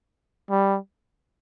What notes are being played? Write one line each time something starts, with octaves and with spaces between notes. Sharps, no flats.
G3